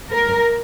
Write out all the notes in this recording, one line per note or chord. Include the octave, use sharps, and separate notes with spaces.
A#4